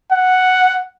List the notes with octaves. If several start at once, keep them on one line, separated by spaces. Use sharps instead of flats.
F#5